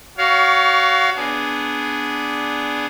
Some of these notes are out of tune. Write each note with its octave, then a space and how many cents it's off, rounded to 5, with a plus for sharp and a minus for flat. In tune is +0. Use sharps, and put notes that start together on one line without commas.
F#4 +15 C#5 +35 F5 +0
B3 +0 D4 +0 G#4 +0